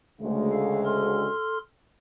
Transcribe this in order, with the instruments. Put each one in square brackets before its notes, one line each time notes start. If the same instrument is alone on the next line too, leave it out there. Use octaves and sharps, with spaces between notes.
[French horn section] D2 C#3 G#3 [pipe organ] A3
[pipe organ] A4 F5
A4 C6 F6